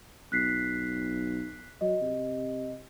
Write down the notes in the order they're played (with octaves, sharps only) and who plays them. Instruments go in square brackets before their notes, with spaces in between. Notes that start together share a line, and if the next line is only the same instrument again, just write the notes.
[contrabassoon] B1 [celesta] F#6 B6 C7
[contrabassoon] F#3 [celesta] D#5
[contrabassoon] C3